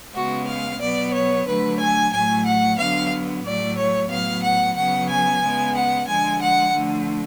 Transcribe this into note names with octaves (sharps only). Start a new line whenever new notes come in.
C#3 G#3 B3 F#4
F5
B2 F#3 B3 D5
C#5
D3 F#3 A3 B4
G#5
A2 F#3 A3 G#5
F#5
D3 F#3 B3 F5
A2 F#3 A3 D5
C#5
A2 F#3 B3 F5
F#5
C#3 F#3 B3 F#5
G#5
C#3 G#3 B3
F#5
D3 F3 G#3 G#5
F#5
D3 F3 A3